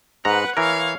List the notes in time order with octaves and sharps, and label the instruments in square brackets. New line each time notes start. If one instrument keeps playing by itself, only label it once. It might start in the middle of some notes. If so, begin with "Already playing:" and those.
[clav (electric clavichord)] G#2 A#5 [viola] B4 F#5
[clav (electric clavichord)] E3 A#4 [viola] C#5 F5